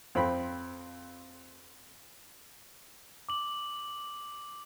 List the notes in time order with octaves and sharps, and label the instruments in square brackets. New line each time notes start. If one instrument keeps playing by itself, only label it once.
[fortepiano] F2 C4 B5
[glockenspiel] D6 F#7